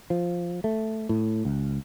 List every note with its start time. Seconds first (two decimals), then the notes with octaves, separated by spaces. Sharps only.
0.10 F3
0.64 A3
1.09 A2
1.45 C#2